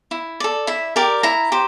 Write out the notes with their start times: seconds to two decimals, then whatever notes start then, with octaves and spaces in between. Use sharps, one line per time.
0.11 E4
0.40 A4 D5
0.67 E4 E5
0.96 G4 A#4 D5 G5
1.23 E4 A#5
1.52 G4 C5